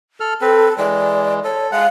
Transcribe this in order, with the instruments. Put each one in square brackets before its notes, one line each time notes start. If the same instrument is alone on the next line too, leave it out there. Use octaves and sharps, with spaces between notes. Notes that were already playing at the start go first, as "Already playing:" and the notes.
[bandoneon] A4 F6
[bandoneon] C4 B4 [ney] A4
[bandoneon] E3 G#3 [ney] D5
[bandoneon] A4 [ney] C#5
[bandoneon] G#3 F#5 [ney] F5